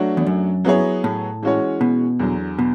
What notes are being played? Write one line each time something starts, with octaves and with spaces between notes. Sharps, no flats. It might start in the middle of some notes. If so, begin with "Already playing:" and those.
Already playing: F#3 A3 D4 F#4 C#5
E2
F#2
F#3 B3 E4 G#4 C#5
A2
E3 G#3 C#4 F#4 C#5
B2
E2 D3 F#3
B2